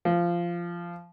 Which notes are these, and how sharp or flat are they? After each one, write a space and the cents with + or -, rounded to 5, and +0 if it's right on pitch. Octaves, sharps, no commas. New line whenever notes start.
F3 -15